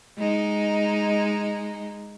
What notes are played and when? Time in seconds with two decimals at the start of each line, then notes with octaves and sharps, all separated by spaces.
0.18 G#3 D#4